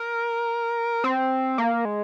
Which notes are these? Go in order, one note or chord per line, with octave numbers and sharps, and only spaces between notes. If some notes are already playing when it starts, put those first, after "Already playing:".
Already playing: A#4
C4
A#3
G#3